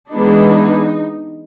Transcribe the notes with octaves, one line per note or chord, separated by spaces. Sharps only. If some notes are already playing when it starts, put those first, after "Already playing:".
E3 G#3 B3 D4 D#4